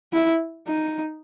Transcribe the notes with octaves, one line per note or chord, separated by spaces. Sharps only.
E4
D#4